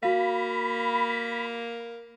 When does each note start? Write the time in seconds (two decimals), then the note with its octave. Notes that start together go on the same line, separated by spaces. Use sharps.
0.03 A#3 F#4 F5 B5